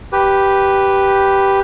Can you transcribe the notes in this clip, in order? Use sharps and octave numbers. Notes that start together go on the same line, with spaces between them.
G4 B4